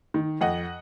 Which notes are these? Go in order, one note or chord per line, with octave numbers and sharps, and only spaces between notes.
D#3
F2 D#5 F#5